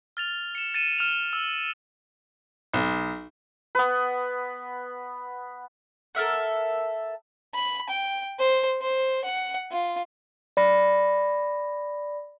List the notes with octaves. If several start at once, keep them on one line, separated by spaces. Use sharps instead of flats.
F6 A6 F7
C#7 E7
A6 C#7 D#7 E7
F6 E7 F7
E6
B1
B3 B4
A4 A#4 E5 F#5
B5
G5
C5
C5
F#5
F4
D5 B5 A#6